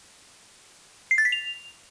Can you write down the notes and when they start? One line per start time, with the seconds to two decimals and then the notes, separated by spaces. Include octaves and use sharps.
1.11 C7
1.18 A6
1.25 B6
1.32 F7